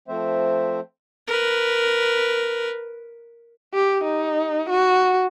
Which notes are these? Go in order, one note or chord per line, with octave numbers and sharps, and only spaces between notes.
F3 A3 C4 C5 E5
A#4 B4
G4
D#4
F#4